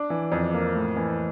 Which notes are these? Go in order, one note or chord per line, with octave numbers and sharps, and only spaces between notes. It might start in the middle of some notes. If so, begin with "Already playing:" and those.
Already playing: D4
E3
F2
A#3
A2
E3